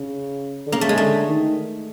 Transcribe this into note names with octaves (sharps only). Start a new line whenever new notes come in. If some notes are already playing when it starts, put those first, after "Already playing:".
Already playing: C#3
D3
C#3 A#3
A3
G#3
D3 A3
D#3